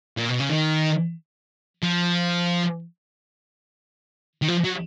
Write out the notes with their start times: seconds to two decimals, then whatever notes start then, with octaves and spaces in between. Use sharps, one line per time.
0.17 A#2
0.29 B2
0.40 C#3
0.50 D#3
1.83 F3
4.42 D#3
4.48 F3
4.64 F#3